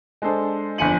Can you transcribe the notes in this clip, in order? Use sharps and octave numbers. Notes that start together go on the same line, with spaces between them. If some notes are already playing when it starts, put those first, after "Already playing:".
G#3 D4 A4 C5
G1 F2 G#5 C#7 D#7 F#7